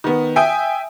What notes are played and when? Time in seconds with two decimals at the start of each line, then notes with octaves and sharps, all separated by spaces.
0.04 D#3 B3
0.36 E5 G5 G#5 D#6